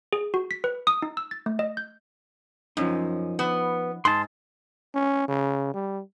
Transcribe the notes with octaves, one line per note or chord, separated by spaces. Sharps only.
G#4
F#4
B6
B4
D#6
D#4
E6
A6
A3
D#5
G6
F#2 F3 C#4 D#4
B3
G#2 A5 C6
C#4
C#3
G3